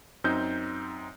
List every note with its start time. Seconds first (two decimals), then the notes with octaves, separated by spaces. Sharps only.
0.24 F#2 C4 D#4 G6